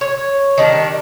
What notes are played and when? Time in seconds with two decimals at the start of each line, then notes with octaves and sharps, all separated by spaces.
0.01 C#5
0.58 D#3 G3 D4